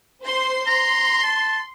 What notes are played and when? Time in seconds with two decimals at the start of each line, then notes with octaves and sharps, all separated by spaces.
0.24 C5 C6
0.67 A#5 C6
1.23 A5